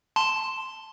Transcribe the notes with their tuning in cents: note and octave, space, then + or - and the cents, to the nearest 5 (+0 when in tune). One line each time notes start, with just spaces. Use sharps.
A5 +0 C6 -5